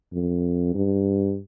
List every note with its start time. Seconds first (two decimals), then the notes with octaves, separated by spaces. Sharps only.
0.13 F2
0.74 G2